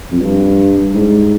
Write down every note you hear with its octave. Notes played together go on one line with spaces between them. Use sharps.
F2
G2
G#2